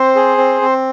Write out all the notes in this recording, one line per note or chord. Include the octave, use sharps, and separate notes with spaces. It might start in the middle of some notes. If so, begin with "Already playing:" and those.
Already playing: C4 C5
G#4
C4
C4